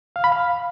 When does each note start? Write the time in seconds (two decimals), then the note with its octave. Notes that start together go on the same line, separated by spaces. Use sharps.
0.16 F5
0.24 B5
0.32 F5